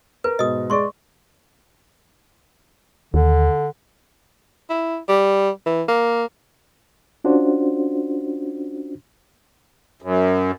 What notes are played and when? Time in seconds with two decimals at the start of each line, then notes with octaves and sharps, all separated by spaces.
0.24 A#4 B4
0.39 G#2 B2 D#5 D#6
0.70 G#3 D5 C6 C#6
3.14 D#2 D3
4.69 E4
5.09 G3
5.66 E3
5.88 A#3
7.24 C#4 D4 F4 F#4 C5
10.02 F#2